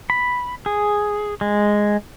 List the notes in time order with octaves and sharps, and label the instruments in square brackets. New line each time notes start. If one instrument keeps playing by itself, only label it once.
[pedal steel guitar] B5
G#4
G#3